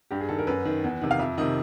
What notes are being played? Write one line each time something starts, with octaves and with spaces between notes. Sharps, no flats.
G2 G4
G#4
D#3 A4
A#4
F#2 B4
D#3
E2
C3 D#3
F5
F2 E5
C3 D#3 D#5